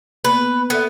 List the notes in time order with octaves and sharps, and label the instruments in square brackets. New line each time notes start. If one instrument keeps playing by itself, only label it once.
[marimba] A#3 B3 [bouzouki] B4
[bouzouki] B3 [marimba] A4 E5